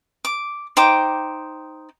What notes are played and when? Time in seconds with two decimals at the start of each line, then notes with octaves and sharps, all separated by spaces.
0.25 D6
0.77 D#4 C5 G5 D6